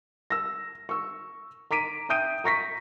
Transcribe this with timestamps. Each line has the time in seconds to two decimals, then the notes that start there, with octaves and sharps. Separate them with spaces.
0.30 E6 A#6
0.89 C#6 E6
1.71 A#5 D6 B6 D7 D#7
2.09 E5 G5 D#6 G6 D7 D#7
2.44 A#5 C#6 A#6 B6